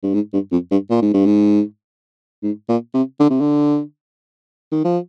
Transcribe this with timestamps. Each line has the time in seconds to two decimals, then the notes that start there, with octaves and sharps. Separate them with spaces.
0.03 G2
0.14 G#2
0.33 G2
0.52 F2
0.71 G2
0.90 A#2
1.02 G#2
1.14 G2
1.26 G#2
2.43 G#2
2.68 A#2
2.94 C3
3.20 D3
3.30 C3
3.40 D3
4.72 D#3
4.84 F3